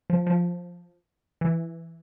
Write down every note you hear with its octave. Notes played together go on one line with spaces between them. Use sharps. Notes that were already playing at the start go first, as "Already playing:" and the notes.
F3
F3
E3